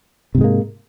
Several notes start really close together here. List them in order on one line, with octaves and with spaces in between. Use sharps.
C3 G#2 G#3 A#3